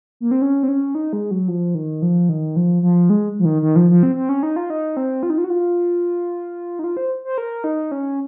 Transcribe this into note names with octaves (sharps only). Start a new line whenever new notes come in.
A#3
C4
C#4
C4
C#4
D#4
G#3
F#3
F3
D#3
F3
D#3
F3
F3
G#3
F3
D#3
D#3
F3
F3
C4
C4
C#4
D#4
F4
D#4
C4
F4
D#4
F4
F#4
F4
D#4
F4
C5
C5
A#4
D#4
C#4